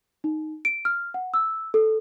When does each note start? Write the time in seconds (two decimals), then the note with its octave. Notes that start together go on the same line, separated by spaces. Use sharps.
0.24 D#4
0.65 D7
0.85 F6
1.14 F#5
1.34 E6
1.74 A4